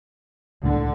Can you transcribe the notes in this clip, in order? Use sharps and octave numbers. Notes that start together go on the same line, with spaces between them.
C#2 A2 D3 D4